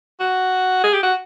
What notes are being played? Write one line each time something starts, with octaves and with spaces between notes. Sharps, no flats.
F#4
G#4
G4
F#4